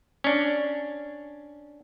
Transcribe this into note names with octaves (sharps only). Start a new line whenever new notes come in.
C#4 D4